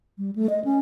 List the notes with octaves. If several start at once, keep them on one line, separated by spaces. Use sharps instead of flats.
G3
A3
D#5
C#4